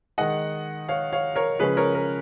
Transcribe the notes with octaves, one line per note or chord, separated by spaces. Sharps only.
D#3 G#3 D#4 D#5 F#5
C#5 F5
C#5 F5
A#4 C#5
C#3 F3 G#3 C#4 G#4 B4
A#4 C#5
A#4